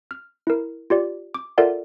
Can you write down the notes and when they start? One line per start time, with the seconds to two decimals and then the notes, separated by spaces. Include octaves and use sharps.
0.11 F6
0.47 E4 A#4
0.90 F4 G4 D5
1.34 D6
1.58 F4 A4 A#4 D5 E5 F#5